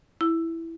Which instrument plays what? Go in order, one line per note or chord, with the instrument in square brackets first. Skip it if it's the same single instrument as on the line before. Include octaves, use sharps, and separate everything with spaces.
[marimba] E4